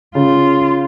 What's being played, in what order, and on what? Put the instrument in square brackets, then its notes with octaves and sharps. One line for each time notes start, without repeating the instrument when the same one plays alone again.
[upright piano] C#3 [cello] F4